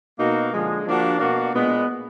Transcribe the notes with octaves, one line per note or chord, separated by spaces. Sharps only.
B2 A#3 D#4 F#4
D3 F3 G#3
F3 A#3 D4 F#4
B2 A#3 D4 F#4
A#2 G#3 B3